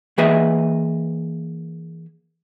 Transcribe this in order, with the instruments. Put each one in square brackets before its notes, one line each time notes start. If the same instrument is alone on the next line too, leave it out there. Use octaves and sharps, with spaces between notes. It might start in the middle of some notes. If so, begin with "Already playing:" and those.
[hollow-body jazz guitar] E3 A#3 G#4 B4 D#5 E5